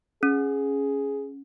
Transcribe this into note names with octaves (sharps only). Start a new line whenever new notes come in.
C#4 G#4